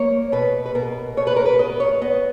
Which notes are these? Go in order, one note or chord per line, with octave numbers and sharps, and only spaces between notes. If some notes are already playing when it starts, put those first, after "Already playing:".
Already playing: A#3 C#5
B2 B4
B4
B2 A#4
B2 C#5
B4
A#4
B4
B3 D#5
C#5
B3 D#5